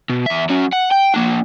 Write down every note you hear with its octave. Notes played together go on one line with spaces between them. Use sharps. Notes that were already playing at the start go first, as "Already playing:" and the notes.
B2
E2 E5
F#3 C#4
F#5
G5
A#3 D4